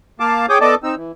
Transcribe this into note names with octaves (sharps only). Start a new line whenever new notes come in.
A#3 F5 A5 D6
G#4 C#5 G5 D6 D#6
B3 A4 D5 D#5 A5 D6
C4 D#4 E6
E3